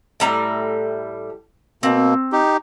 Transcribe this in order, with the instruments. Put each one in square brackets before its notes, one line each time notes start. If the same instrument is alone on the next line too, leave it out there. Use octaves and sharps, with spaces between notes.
[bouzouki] A2 G3 A#5
[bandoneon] B2 A#3 [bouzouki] C4
[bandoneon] D#4 G4